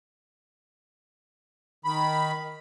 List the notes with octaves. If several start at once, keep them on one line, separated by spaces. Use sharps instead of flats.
D#3 B5